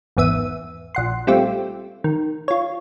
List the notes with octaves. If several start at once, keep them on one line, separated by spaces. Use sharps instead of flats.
G#1 E2 B3 E5 D#7
A#1 F#5 C6
G3 A3 C4 F4 G4
D#3
F4 C#5